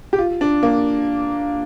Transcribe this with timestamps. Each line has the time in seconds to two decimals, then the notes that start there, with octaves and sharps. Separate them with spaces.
0.13 G4
0.19 F4
0.41 D4
0.63 A#3